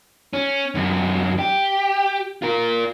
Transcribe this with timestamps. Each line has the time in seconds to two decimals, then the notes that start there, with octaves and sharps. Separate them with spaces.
0.33 C#4
0.75 F#2 D3
1.39 G4
2.42 F4 A#4